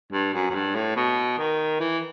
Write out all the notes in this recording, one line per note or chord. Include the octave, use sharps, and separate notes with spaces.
G2
F#2
F#2
G2
A2
B2
D#3
E3